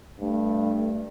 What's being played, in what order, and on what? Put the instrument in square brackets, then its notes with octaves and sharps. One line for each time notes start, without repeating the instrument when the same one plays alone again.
[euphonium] G2 [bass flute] A3